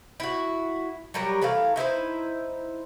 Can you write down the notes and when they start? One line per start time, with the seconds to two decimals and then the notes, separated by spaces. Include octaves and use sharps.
0.20 E4 F#4
1.14 F#3 G3 A#4
1.42 E3 A3 A#4 F5
1.76 D#4 E4 B4 C5